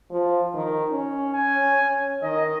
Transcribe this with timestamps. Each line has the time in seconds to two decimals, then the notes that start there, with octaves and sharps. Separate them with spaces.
0.11 F3
0.54 D#3
0.91 C#4
1.34 G#5
2.23 D#3 D#5